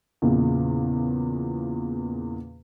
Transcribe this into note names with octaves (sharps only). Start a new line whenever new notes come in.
E2 A#2 C#3